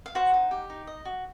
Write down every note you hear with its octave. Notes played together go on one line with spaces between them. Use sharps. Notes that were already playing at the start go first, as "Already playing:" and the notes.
F5
F#4 C5 F#5
D#4
G4
D#4
D#5
F#4